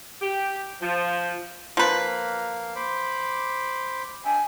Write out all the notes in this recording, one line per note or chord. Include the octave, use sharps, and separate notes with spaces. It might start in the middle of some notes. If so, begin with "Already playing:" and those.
G4
F3
F3 A#3 B4 F5
C5 B5 D6
D4 E5 G5 G#5